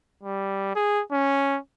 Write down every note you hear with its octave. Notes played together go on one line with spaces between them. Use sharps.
G3
G#4
C#4